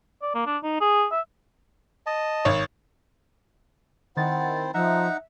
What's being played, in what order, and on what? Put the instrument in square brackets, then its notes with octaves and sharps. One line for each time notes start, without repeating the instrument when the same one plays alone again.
[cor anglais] D5
A#3
D4
D#4
G#4
E5
[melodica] D#5 A5
[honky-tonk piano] G#1 C#5
[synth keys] D#3 A6 [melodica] C4 E4 C5 [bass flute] F#5
[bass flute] F3 [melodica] D#4 F#5 A#5 [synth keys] E5